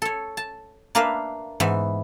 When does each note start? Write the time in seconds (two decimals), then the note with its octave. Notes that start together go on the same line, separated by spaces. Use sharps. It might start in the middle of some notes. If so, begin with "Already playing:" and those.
0.02 A4 C#5
0.37 A5
0.95 A#3 D4 A#4 B4 E5 F5
1.60 G#2 E3 B3 B4 E5